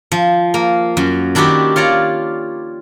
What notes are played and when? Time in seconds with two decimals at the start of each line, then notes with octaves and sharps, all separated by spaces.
0.12 F3
0.54 A#3
0.97 F#2 F#3
1.35 D#3 D4 E4 F#4 G4
1.76 F4 C#5 D5 A#5